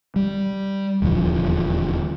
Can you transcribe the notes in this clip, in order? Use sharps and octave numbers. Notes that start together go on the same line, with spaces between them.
G3
D#1 E2 D3 F3